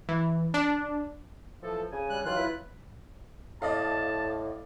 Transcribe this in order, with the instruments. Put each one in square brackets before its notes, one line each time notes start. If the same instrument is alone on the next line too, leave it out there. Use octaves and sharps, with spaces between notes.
[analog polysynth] E3
D4
[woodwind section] E3 F3 A4
C#3 G#5
[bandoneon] G3 F#6
[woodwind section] D#3 E3 F5 [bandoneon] F#3 F4 F#6
[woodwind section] E4 B4
[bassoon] A2 [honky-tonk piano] D5 D#5 F5 [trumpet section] A5